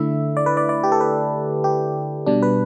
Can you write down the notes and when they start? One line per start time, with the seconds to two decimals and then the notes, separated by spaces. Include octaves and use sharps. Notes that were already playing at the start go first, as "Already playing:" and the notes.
Already playing: D3 A3 E4 E5
0.37 D5
0.46 B4
0.57 D5
0.69 D5
0.84 G4
0.92 A4
1.01 B4
1.64 G4
2.26 B2 G3 D4
2.43 B4